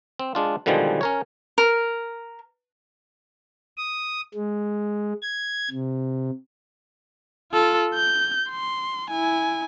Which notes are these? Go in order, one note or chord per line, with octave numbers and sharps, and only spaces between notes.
C4
G#3 D4 F4
B2 D3 D#3 F3 G3 G#3
C#4 A#4 C#5
A#4
D#6
G#3
G#6
C3
F4 A4
G6
C6
E4 G#5